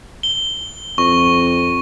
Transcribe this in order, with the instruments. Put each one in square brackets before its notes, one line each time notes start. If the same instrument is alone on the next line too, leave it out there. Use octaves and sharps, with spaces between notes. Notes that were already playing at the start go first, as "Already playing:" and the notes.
[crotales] G7
[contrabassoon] F2 [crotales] C#6